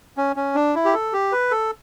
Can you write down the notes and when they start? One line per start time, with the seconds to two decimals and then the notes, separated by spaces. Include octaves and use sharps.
0.17 C#4
0.36 C#4
0.55 D4
0.75 E4
0.85 G4
0.94 A4
1.13 G4
1.32 B4
1.51 A4